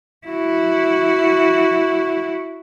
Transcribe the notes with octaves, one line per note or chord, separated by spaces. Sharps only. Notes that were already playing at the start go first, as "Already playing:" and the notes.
E4 F#4